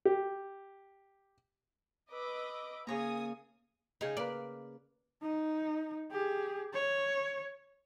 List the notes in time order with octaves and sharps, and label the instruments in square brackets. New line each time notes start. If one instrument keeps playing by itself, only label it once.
[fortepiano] G4
[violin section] B4 D#5 D6 [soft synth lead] E6
[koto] C#3 C#5 A#5 [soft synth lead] A#3 [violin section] G#5 D#6
[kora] C#3 G5 [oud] D#4 G#4
[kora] A#3 B4 [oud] D5
[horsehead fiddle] D#4
G4 G#4
C#5